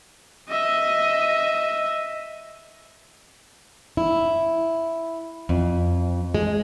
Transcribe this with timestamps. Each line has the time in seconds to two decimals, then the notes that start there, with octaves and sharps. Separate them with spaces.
0.49 D#5 E5
3.97 E4
5.49 F2
6.35 G#3